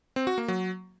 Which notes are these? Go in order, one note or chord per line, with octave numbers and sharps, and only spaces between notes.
C4
F#4
A#3
F#3